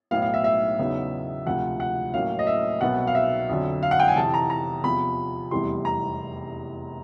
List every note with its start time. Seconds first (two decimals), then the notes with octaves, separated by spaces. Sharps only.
0.11 B1 A2 F#3 B3 F5
0.22 F5
0.34 E5
0.44 E5
0.78 E2 C#3 F#3 B3 D#4
1.46 D2 C3 F3 F#5
1.80 F#5
2.14 A1 A2 F#3 A#3 C#4 F5
2.39 D#5
2.47 E5
2.81 C2 B2 F#3 B3 F#5
3.07 F5
3.15 E5
3.49 F2 D3 F#3
3.83 F5
3.91 F#5
4.00 G5
4.08 G#5
4.16 F2 C3 E3 A5
4.34 A#5
4.50 A#5
4.83 E2 C3 F3 B5
5.51 F1 E2 C3 E3 G3 C6
5.85 A#5